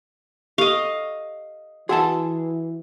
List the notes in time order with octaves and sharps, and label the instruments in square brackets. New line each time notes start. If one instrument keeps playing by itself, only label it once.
[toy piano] G4 A4 [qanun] D#5 F5
[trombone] E3 [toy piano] F#4 F#5 [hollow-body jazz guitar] G#4 E5 A5